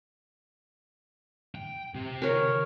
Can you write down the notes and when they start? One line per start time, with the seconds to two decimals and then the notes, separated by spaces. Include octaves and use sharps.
1.55 G5
1.95 C3
2.22 A#4 C#5